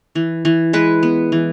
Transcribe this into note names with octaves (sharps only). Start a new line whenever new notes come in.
E3
E3
G#3 B4
B3
E3